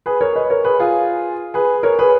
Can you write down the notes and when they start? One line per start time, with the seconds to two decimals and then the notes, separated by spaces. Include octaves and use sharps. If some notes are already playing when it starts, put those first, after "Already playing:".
0.06 G#4 B4
0.21 A#4 C#5
0.36 B4 D#5
0.50 A#4 C#5
0.64 G#4 B4
0.80 F4 G#4
1.54 G#4 B4
1.83 A#4 C#5
1.99 G#4 B4